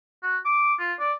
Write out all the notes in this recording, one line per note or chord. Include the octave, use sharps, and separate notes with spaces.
F#4
D6
F4
D5